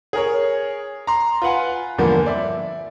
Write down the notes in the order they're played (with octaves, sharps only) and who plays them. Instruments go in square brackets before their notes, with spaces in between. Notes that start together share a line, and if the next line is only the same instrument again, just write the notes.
[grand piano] G#4 A#4 C#5
A#5 C6
F4 B4 F#5 G#5
E2 G2 D3 F3 A#3
D5 E5